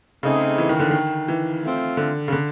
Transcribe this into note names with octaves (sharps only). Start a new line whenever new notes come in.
C#3 A3 C4 D#4 G#4
E3
D#3
D3
D#3
E3
A3 C4 F4
D3
C#3
D3